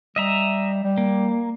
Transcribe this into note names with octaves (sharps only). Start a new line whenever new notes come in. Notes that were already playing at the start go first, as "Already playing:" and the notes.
G3 D#5 E5 A#5
G3
A#3